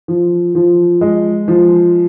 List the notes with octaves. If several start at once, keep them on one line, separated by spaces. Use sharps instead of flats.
F3
F3
G#3
F3